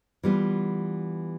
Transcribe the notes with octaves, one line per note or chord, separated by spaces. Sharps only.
E3 G3 B3 F4